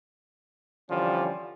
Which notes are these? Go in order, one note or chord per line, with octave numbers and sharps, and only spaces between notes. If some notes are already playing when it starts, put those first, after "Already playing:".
D3 E3 F3 G3 C#4